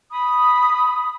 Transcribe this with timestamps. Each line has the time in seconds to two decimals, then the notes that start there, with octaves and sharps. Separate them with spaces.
0.11 B5 D#6